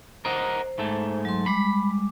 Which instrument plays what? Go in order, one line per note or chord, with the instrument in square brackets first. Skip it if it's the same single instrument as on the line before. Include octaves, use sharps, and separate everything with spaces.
[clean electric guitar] A#4 D#5 F#5 [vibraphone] C5
[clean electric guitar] G#2 A3
[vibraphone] F#3 C6
[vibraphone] G3 G#3 D6 [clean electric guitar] B5